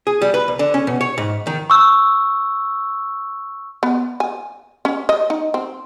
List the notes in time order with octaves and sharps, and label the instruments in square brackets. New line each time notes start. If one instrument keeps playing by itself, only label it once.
[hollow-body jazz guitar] G#4
G3
B4
C2
D3
C#4
B2
C#5
G#2
D#3
[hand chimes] C#6 E6
[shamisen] B3
G#5
C#4
D#5
D#4
C4